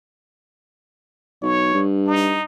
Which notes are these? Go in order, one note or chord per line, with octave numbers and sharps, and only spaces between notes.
B1 C#5
G2
D#4